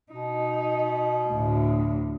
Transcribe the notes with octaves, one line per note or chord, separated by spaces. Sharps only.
B2 D#4
D2 A2